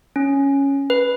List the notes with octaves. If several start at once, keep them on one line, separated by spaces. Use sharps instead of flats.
C#4
B4